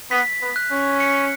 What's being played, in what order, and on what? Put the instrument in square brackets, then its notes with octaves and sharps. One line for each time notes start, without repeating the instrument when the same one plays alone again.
[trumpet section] B3 [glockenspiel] B6
[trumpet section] B3
[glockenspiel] F#6
[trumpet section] C#4
[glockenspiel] C#7